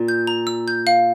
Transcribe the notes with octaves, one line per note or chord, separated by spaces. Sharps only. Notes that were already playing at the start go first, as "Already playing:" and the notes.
Already playing: A#2
G6
A#5
E6
G6
F5